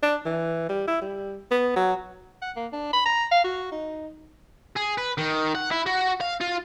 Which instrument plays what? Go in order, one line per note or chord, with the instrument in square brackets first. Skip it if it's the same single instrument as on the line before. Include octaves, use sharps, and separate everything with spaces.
[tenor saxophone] D4
E3
G3
E4
G3
B3
F#3
[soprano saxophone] F#5
A#3
D4
B5
A#5
F5
F#4
D#4
[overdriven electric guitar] G#4
B4
D#3
F#5
E4
F#4
F5
F4